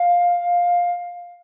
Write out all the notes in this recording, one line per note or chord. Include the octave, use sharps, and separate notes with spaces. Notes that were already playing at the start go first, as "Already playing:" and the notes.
Already playing: F5